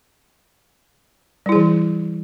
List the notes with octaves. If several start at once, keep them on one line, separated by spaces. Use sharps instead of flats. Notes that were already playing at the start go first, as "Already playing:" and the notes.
E3 G3 E4 G#4